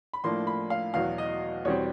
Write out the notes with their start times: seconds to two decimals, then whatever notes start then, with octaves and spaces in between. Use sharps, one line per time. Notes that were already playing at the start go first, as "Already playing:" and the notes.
0.13 B5
0.24 A2 F3 A#3 D4 C6
0.47 B5
0.70 F5
0.94 E2 B2 F#3 F5
1.18 D#5
1.65 E2 B2 G3 C4 C#5